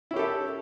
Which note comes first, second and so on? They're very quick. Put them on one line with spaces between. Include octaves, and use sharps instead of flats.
E4 C#4 G4 A4 E5